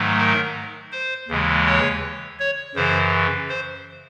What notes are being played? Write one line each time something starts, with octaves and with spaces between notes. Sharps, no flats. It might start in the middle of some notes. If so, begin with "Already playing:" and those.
Already playing: G#2 D#3 F#3 A3
A#4
C5
D#2 C#3 E3 G#3
C#5
C#5
F#2 C#3 E3 C5
C5